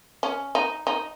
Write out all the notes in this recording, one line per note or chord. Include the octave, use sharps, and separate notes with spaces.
C#4
D#4
D#4